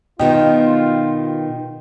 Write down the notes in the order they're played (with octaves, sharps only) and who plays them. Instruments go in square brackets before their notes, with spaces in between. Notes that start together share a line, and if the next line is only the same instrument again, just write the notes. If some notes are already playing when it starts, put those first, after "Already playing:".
[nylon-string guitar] B2 D#3 B3 [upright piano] D#4 G4 [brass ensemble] F4